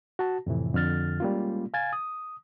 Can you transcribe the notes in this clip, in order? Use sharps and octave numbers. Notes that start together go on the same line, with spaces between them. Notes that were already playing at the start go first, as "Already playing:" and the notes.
F#4 A5
F2 A2 C3 E3
F2 D3 F6 A6
G3 G#3 A#3 C#4 F4
F5 G#5 G#6 A6
D#6